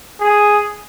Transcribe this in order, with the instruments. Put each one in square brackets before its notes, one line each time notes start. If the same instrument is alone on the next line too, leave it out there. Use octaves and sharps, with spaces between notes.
[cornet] G#4